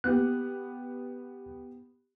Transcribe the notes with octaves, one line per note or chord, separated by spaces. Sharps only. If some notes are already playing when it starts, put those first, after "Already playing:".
B3 G4 F#6